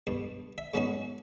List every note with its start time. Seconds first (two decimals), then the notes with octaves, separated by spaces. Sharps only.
0.07 G2 B2
0.58 E5
0.74 G#2 F#3 B3 C#4 D#4 F#4